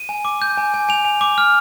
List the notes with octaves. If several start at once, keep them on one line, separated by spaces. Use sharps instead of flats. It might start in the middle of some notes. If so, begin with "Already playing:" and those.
Already playing: D#7
G#5
D6
G6
G#5
G#5
G#5 F7
G#5
D6
F6